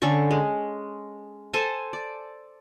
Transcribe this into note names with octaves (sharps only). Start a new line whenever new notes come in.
D3 C#4 A4 C#6
G#3
A4 C5 G#5 A5
D5